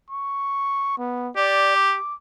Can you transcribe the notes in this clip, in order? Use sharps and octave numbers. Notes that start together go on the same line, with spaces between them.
C#6
B3
G4 D5
D6